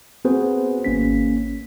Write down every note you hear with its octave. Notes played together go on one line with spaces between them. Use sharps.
B3 C4 F#4 G#4 B4 C5
G#1 A#3 C#4 B6